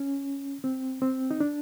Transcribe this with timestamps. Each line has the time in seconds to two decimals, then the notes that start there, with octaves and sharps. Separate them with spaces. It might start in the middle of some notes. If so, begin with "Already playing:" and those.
Already playing: C#4
0.64 C4
1.02 C4
1.31 D#4
1.40 D4